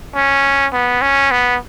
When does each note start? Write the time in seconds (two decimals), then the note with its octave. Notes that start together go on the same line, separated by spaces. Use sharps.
0.15 C#4
0.73 B3
1.02 C#4
1.31 B3